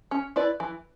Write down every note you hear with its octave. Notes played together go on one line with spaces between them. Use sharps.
C#4
E4 B4 D5
E3